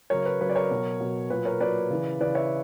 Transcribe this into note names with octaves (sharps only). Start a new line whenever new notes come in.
C#3 F#3 A#4 C#5
B4
C#3 F#3 B4
D5
A#4 C#5
B2 F#3
B2 F#3
A#2 F#3 B4
A#4 C#5
A#2 F#3 B4 D5
C#3 E3
C#3 E3 B4 D5
C#5 E5